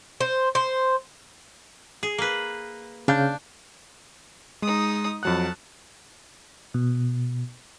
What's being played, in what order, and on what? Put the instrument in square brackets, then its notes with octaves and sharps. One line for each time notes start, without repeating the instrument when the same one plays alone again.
[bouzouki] C5
C5
[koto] G#4
A#3 B4
[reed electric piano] C#3 F5 G6 [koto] D4
[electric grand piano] G#3 [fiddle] D#4 D#6
[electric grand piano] F2 F#3 F#6 [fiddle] F#5 A5
[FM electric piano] B2